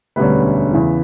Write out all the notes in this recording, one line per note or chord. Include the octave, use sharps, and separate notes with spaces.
E1 D2 D3 G3 C#4 B4
E2 C#3 E3